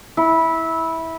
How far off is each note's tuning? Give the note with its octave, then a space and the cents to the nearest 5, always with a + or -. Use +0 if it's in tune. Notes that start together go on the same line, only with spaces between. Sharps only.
E4 -15